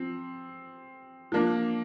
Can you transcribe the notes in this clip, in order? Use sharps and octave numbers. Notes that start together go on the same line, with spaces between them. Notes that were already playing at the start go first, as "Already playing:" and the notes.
Already playing: F3 C4
F3 A#3 D4